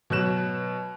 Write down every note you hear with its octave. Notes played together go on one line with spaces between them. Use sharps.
B2 F#3 F#6 E7